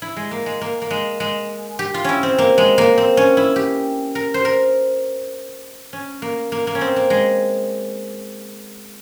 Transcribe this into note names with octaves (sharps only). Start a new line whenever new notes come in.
E4
G#3
A#3
G#3
A#3
A#3
G#3
G#3
G4
F4
C#4 E4
C4
A#3
G#3
A#3
C4
C#4
E4
G4
A#4
C5
A#4
C#4
A#3
A#3
A#3
C#4
C4
A#3
G#3